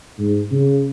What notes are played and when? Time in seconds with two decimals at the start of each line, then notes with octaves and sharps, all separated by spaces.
0.19 G#2
0.51 C#3